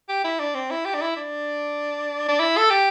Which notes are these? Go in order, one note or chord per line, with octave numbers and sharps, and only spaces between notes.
G4
E4
D4
C4
E4
G4
D4
E4
D4
D4
E4
A4
G4